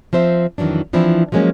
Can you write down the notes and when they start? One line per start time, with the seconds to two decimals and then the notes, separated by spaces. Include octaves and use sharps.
0.13 F3 C4 C5 E5
0.58 F2 D#3 E3 F#3 D4
0.93 E3 F3 C4 D4 E4
1.32 F3 F#3 G#3 A#3 C#4